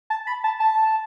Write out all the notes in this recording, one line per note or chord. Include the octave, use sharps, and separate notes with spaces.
A5
B5
A5
A5